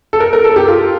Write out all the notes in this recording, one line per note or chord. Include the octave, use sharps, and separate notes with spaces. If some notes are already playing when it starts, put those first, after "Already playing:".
A4
A#4
A#4
A4
G4
F4